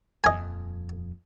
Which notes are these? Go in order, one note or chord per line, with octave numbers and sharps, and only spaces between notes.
D#1 F2 D#5 G#5